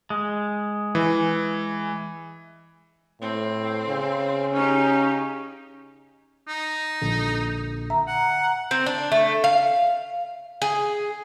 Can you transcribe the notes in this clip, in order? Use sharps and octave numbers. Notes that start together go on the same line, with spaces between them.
G#3
E3
A2 C4
C#3
C#4 D#4 G4
D#4
A#1 A#2 D3
E5 A#5
F#5
C4
D4
A3
F5
G#4